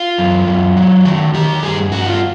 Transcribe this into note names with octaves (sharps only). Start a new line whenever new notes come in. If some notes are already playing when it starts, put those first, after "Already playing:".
Already playing: F4
F#2
F#2
F#3
D#3 F#4
D#3 G4
G2 G#4
G2 F#4
F4